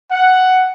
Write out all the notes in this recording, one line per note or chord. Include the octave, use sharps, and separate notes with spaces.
F#5